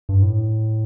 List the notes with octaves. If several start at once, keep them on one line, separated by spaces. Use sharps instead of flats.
G2
A2